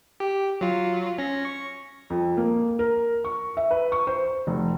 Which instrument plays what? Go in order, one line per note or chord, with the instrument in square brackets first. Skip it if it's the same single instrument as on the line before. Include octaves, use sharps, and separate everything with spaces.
[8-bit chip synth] G4
F#3 F4
C#4 A#6
C#6
[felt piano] F2
A#3
A#4
C#6
E5
B4
C#6
C5
F1